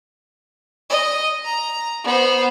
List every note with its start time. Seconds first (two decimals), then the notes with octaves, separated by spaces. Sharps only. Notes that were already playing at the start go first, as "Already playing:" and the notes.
0.90 D#5
1.45 A#5
2.04 B3 C5